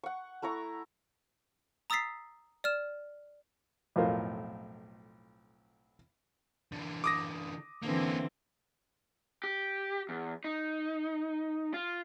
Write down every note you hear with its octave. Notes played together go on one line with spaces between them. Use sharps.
F#5 C#6
A3 E4 A#5 C#6
A#5 D#6 E6 A6 B6 C7
D5 F6 E7
B1 F2 A2 F4 A#4 C5
D3 E3
D6 D#6 A#6
D3 E3 A#3 C4 C#4
G4
E2
D#4
F4